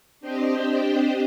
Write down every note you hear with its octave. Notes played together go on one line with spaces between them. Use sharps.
C4 D4 G4 C5 D#5 G5